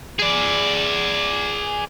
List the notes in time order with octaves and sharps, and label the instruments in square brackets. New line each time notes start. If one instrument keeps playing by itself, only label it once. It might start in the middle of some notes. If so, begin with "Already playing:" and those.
[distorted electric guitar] G#4 D5